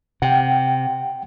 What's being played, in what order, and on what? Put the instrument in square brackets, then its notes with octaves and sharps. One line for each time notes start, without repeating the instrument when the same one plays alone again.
[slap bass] C3 [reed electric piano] F#5 G5